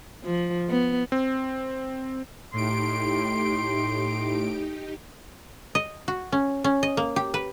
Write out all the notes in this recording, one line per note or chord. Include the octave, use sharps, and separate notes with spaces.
F3
B3
C4
A2 D#4 G4 C6 D7
D#5
F#4
C#4
C#4
D#5
A#3
G4
B4